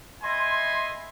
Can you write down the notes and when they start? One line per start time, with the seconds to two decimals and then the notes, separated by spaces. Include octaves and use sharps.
0.22 D#5 E5 G#5 B5 C6